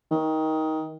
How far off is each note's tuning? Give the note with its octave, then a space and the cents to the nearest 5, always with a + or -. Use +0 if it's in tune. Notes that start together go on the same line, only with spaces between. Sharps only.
D#3 +20